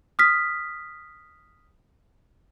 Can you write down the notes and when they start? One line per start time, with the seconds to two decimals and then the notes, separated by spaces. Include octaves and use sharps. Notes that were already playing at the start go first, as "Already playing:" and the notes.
0.19 D#6 F6 B6